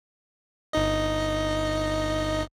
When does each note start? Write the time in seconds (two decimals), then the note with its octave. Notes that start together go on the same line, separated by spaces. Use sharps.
0.73 G1 D#4 D#5